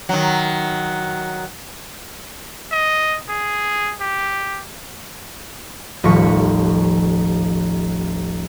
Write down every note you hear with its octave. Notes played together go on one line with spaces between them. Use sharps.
D#3 F#3
D#5
G#4
G4
D#1 A1 F3 C#6 B6 C#7